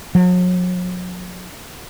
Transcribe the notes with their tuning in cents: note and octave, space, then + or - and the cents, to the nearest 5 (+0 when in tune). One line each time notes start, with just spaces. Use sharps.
F#3 -40